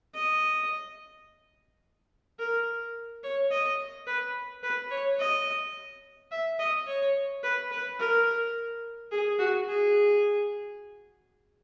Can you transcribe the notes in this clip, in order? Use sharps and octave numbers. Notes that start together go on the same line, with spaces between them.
D#5
A#4
C#5
D#5
B4
B4
C#5
D#5
E5
D#5
C#5
B4
B4
A#4
G#4
F#4
G#4